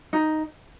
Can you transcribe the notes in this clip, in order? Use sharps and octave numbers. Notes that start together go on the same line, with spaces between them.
D#4